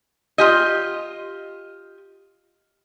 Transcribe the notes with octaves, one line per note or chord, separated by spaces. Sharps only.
F4 G4 D#5